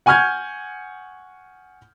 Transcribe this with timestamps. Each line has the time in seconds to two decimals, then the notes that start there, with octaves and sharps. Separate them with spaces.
0.06 F#5 G#5 C#6 F6 G6 G#6